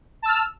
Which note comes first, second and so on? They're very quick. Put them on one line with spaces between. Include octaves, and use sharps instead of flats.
A5 E6 F6